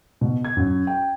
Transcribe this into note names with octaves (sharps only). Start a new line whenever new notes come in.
B2
G#6
F#2
G5